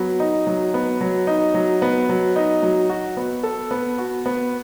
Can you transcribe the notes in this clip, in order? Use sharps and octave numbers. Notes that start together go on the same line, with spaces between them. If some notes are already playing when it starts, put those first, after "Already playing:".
Already playing: F#3 B3
D#4
F#3
B3
F#3
D#4
F#3
B3
F#3
D#4
F#3
F#4
B3
A4
B3
F#4
B3